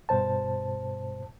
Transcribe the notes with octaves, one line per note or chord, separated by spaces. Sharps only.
G2 B2 C5 A5